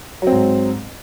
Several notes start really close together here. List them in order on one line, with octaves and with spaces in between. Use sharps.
F#3 C4 G#2